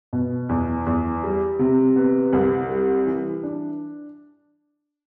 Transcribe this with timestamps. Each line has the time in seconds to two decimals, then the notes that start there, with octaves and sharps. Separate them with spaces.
0.13 B2
0.49 E2
0.86 E2
1.24 G3
1.59 C3
1.96 B3
2.33 C2
2.69 G3
3.06 E3
3.43 D4